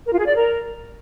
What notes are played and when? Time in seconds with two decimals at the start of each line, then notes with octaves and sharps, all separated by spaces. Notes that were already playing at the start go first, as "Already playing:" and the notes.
0.05 A#4
0.12 F4
0.19 G#4
0.27 D5
0.34 A#4